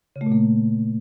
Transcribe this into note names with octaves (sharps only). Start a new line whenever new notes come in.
C#3
A3
A#2
A#3